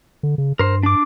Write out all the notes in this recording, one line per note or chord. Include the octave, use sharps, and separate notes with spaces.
D3
C#3
G2 A#4 C5
D4 D6